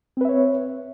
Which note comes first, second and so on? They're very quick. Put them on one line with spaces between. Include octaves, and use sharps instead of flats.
C4 B4 E5 C#5